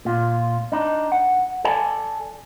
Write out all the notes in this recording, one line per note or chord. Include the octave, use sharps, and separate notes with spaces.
A#2 F4
D4 D#4
F#5
A4 D5 G#5 A5